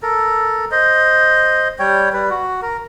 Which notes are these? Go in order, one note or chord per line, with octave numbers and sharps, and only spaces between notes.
A4 A#4
C5 D#5
G3 C#5 G5
G3 B4
F#4
A#4